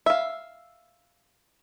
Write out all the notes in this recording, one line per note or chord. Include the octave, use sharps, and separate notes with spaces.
E5 F5